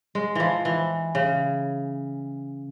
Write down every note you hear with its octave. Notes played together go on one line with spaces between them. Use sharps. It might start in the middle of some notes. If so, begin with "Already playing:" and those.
G#3
E3 F3
E3
C#3